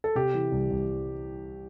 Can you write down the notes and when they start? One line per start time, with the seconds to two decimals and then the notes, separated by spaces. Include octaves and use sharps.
0.04 A4
0.15 C3 G4
0.34 E3
0.52 C2
0.70 C2